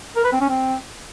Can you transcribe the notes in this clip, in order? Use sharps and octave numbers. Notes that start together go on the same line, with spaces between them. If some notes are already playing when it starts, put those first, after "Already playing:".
A#4
B4
C4
C#4
C4